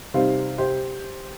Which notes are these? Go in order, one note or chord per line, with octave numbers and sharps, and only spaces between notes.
C3 G3 C4 D#4 C5 F5
G4 C5